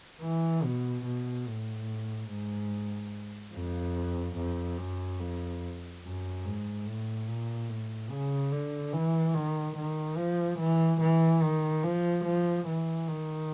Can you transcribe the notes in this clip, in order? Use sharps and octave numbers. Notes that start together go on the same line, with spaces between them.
E3
B2
B2
A2
G#2
F2
F2
F#2
F2
F#2
G#2
A2
A#2
A2
C#3
D3
E3
D#3
D#3
F3
E3
E3
D#3
F3
F3
E3
D#3